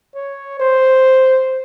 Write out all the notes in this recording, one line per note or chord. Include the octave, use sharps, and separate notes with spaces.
C#5
C5